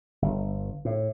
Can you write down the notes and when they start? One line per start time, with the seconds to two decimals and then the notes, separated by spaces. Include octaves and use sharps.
0.22 G1
0.85 A2